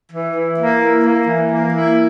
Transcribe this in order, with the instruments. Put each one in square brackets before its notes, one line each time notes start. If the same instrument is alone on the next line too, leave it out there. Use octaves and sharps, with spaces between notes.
[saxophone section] E3
E4
A#3
E4
A#3
E3
A#3
E4